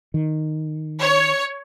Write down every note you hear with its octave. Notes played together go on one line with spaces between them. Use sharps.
D#3
C#5